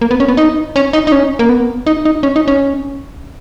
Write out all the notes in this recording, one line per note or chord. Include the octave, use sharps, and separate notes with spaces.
A#3
B3
C#4
B3
D#4
C#4
D#4
D#4
C#4
A#3
B3
D#4
D#4
C#4
D#4
C#4